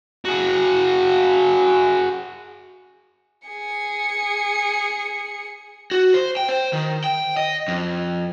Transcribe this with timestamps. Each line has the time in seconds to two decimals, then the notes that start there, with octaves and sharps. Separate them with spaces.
0.25 F#4 G#4
3.48 G#4 C#7
5.91 F#4
6.14 C5
6.37 G5
6.49 C5
6.73 D#3
7.04 G5
7.37 D#5
7.68 F2